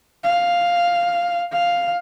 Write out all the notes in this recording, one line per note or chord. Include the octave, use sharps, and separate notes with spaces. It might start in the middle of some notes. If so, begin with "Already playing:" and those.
F5
F5